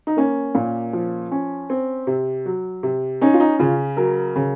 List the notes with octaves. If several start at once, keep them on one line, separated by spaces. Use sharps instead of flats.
D#4
A#3 C#4
A#2
F3
C#4
C4
C3
F#3
C3
C#4 D#4
F4
D#4
C#3 F4
F#3 A#4
C#3